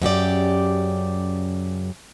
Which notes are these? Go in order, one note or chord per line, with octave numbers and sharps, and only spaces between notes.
F#2 C#3 G4 D5